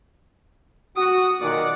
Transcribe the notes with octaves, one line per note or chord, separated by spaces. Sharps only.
F#4 D#6
B1 A#2 D#3 D5 F#5